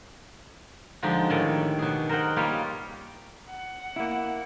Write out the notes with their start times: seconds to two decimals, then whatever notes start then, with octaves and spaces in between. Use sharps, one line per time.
1.03 D3 F3 G#3 D#4 G4
1.30 A2 D#3 C#5 D5 G5
1.79 B2 G#4
2.09 A#4 C5 D#5 F#5 G5
2.36 G3 A#3 F4 G4 C#5 F5
3.49 F#5
3.96 A#3 E4